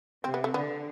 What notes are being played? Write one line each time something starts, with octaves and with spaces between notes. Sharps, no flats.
C3 C4
B3
A3
D3 B3